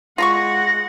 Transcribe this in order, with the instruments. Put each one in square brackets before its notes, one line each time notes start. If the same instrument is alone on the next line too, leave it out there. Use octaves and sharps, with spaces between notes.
[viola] G#3 F#5 [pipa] F4 A#5 C#6 [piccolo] A#6